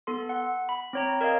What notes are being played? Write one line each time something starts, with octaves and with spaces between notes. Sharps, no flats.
B3 A4 C6
F#5
B5
C4 C#5 A#5
A#4 C#5 D#5 F5